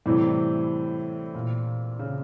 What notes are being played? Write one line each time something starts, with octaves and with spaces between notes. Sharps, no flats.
A2 C3 E3 G3
A#2
C#3